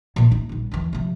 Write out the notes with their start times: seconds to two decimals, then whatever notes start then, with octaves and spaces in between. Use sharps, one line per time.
0.16 A#2 E3
0.32 D#4
0.49 A#1 G3
0.71 D#2 E3
0.93 C3 F3